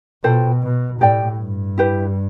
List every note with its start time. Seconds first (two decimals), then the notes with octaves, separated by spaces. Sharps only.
0.23 B2 F4 A4 C5 G5
0.63 B2
1.00 A2 G4 D5 G5
1.39 G2
1.78 E4 G4 B4